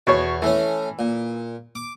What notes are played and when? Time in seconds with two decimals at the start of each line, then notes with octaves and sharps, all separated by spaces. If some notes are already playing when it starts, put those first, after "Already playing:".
0.07 E2 B2 C#5
0.42 E3 A3 C#4
0.99 A#2
1.75 D6